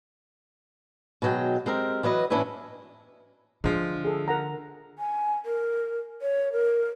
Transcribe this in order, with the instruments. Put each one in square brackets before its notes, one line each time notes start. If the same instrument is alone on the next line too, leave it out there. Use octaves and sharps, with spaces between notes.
[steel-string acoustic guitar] B2 D#3 F#3 G#3 G5
G#3 C4 G4 A#4
E3 F#3 B4 D#5
A2 E3 C#4 D4 E4 B4
[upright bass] D3 [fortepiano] F3 G#3
[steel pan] G#4 A4
A#4 F#5 A#5
[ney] G#5
A#4
C#5
A#4